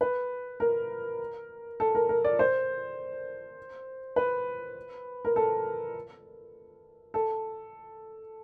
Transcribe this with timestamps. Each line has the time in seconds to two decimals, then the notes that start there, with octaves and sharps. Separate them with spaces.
0.01 B4
0.60 A#4
1.80 A4
1.95 A#4
2.09 A#4
2.24 D5
2.39 C5
4.16 B4
5.25 A#4
5.36 A4
7.14 A4